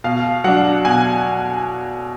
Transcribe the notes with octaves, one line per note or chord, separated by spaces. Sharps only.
B2 F5
F#3 D4 F#5
B2 G#5